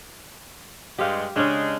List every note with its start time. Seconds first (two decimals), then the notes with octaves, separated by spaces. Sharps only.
0.98 G2 G#3 G4 F5
1.36 C#3 G#3 C#4 D4